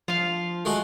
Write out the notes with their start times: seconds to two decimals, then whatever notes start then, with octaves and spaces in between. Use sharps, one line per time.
0.08 F3 F4 F5
0.65 G#3 A3 F#4